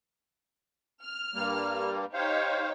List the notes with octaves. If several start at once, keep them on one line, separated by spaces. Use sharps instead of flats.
F6
G2 G3 A#3
D#4 G4 C5 C#5 F5